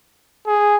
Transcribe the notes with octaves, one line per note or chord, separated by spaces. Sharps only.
G#4